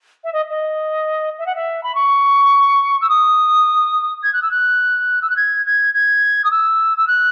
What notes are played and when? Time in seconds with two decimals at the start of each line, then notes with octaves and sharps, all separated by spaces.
0.24 E5
0.33 D#5
0.50 D#5
1.38 E5
1.46 F#5
1.55 E5
1.83 B5
1.95 C#6
3.01 E6
3.09 D#6
4.23 G#6
4.33 F#6
4.42 E6
4.51 F#6
5.22 E6
5.29 F#6
5.36 G#6
5.65 G#6
5.94 G#6
6.44 D#6
6.51 E6
6.97 E6
7.07 F#6